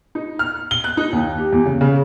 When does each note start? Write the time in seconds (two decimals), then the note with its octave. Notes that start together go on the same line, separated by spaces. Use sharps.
0.15 D#4
0.39 F6
0.71 G7
0.84 F#6
0.97 D#4
1.12 D#2
1.38 G4
1.53 E2
1.66 C#3
1.81 C#3